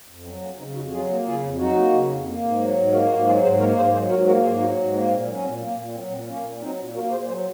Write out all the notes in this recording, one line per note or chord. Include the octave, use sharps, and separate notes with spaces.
F2
F#3 C4
A#3 C#4
C#3 C4 D#4
F2 D#4 F#4
F#4
F#3 F4 G#4
A#3
C#3 F4 G#4
F2
F#3 D#4 F#4
A#3
C#3
F2
A#3
G#2
F#3
G#2
A#3 F#4 A#4
G#2 D#4 F#4
F#3 F4 G#4
G#2 G#4 C5
A#3 A#4 C#5
G#2 G#4 C5
F#3 G#4 C5
G#2 F#4 A#4
A#3 F#4 A#4
G#2 F4 G#4
F#3 D#4 F#4
G#2
A#3 C4 D#4
A#2 C4
F#3 C#4
A#2 C4
A#3
A#2 A#3
F#3 C4
A#2 C4
A#3 C#4
A#2
F#3 C4 D#4
A#2
A#3 F#4 A#4
A#2 G#4 C5
F#3 G#4 C5